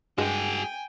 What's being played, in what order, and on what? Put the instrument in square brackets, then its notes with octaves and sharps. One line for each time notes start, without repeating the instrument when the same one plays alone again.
[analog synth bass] G2 [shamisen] G#3 [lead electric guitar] F#4 G#4 [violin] G5 G#5